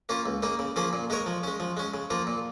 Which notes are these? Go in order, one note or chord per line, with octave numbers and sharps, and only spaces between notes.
A#3 C#4 F4
C#2
C#3 A#3 D#4
C#3
F3 A#3 C#4 G#4
A#2
G#3 D#4 A#4 C#5
F3
G#3 C#4
F3
G#3 C#4
C#3
F3 A#3 F4
A#2